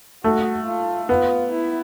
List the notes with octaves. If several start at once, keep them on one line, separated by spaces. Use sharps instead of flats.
A3 F#4
F4
B3 F4
E4